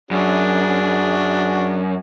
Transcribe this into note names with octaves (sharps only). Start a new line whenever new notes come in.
F#2 D4 F#4 G#4